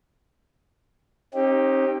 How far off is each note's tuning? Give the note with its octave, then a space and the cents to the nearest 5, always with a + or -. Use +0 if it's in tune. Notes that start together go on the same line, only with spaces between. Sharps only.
C4 +45 D#4 +0 G4 +0